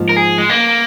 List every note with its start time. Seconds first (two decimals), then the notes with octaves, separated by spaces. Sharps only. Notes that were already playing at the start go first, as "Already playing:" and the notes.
Already playing: G#2 F3 A#3
0.09 A#4
0.16 G#4
0.38 G#3
0.49 A#3